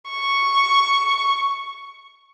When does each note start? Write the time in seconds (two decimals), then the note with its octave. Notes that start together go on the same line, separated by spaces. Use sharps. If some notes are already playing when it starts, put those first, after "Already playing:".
0.11 C#6